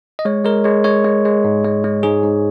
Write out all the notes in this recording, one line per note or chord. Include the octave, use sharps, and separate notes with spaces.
D#5
G#3 C#5
G#3 A#4
G#3 C#5
G#3 C#5
G#3
G#3
G#2
G#3
G#3
G#2 G#4
G#2